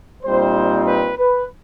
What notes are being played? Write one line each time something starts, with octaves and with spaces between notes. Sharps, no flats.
A#2 G3 C4 D#4 C5
B4
B4